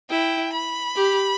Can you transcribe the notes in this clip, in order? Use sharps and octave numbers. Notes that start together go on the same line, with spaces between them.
E4 G5
B5
G4